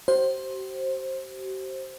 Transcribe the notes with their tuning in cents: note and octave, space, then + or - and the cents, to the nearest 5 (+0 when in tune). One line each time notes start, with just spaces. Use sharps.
G4 -45 C5 +15